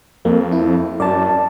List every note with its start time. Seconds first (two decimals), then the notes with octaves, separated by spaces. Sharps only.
0.25 F2 A#3
0.52 E4
1.00 F#2 D5 A5